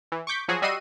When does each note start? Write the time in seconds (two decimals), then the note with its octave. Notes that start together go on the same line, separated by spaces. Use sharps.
0.12 E3
0.27 C#6 D6 G6 B6
0.48 F3 F#3 F#4 G#4
0.62 G3 F#4 D#5 E6 C7 D#7